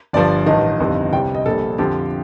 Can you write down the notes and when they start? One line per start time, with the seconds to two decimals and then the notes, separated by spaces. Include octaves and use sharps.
0.13 G1 G2 F3 D5
0.46 A1 G2 D#3 D#5
0.80 G1 F2 D#3 G3
1.13 C2 C3 G3 G5
1.35 D#5
1.46 A#1 A#2 G3 A4
1.78 F2 D3 F3 G4